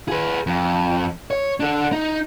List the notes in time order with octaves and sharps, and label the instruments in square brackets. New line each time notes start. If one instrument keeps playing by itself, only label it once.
[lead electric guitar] G#4 B4
F2
C#5
D4 A4
D#4